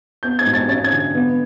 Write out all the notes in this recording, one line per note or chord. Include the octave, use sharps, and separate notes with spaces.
B3 G6
G#6
G#2
A6
C#4 A6
G#6
D3
B3